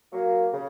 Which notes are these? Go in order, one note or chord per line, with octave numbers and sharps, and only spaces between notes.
F#3 A#3
C#3